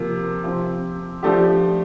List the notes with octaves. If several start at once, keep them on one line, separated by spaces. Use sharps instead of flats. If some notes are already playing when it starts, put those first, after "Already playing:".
Already playing: C3 F3 A#3
C3 F3 C4
F3 A3 D4 G4